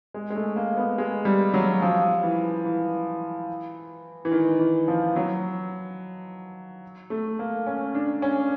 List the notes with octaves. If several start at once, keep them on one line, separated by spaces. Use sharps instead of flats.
G#3
G#3
A3
A#3
B3
G#3
G3
F#3
F3
E3
E3
E3
D#3
E3
F3
F#3
A3
A#3
C#4
D4
C#4